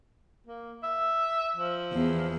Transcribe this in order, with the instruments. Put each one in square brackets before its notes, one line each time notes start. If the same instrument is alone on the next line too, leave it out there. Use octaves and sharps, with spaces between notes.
[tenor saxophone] A#3
E5
F3
[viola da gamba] E2